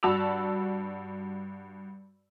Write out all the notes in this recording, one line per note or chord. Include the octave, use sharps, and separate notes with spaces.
G2 F#4 A5 B5 E6 F7